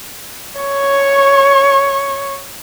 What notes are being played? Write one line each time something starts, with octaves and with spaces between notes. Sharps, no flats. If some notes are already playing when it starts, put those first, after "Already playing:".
C#5 C#6